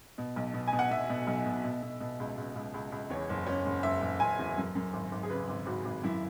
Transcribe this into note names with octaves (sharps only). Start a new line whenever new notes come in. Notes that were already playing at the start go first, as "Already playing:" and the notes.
B2
B1
B2
G#5
B2
F#5
B2 E5
B2
B1
B2
B2
B2
B2
C#2
C#2
C#2
C#2
C#2
E2 C#5
F#1
F#1 C#4
F#1
F#1 E5
F#1
F#1 G#5
E2
F#2
F#2
G#1
G#1
G#4
C#3 B4
G#1
G#1 F#4
G#1
F#2 E4